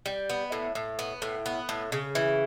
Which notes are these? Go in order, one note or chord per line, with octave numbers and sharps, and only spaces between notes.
G3
B3
A2
A2
B3
A2
B3
A2
C#3
E3